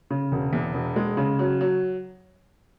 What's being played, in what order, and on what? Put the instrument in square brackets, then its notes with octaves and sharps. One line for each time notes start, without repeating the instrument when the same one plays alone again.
[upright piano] C#3
E1
E2
E1
G#3
C#3
F#3
F#3